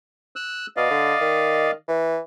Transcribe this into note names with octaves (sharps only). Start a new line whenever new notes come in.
E6 F#6
B2 D5 D#5 F5
D3
D#3
E3